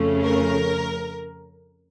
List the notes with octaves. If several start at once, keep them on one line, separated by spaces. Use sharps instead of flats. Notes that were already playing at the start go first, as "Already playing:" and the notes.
Already playing: F2 C#3 F3 A3 C#4
A#4